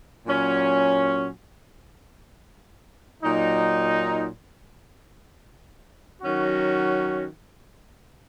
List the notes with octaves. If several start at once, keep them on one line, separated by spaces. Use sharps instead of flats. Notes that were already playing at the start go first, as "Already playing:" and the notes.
A#2 F#3 C#4
A#2 F#3 D#4
D#3 F#3 C#4 F#4